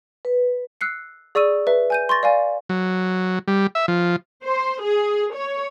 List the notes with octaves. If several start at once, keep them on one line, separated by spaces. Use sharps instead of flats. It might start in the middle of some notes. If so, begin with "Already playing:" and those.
B4
E6 F#6 C7 C#7
G#4 D5 C#6 E6 D#7
B4 E5
G#5 G6 D#7
C6 C#6 A6 A#6
D5 F5 G#5
F#3
G3
E5
F3
C5
G#4
C#5